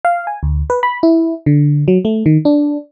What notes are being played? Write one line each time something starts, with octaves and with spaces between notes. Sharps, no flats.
F5
G#5
D2
B4
B5
E4
D3
F#3
A3
D#3
D4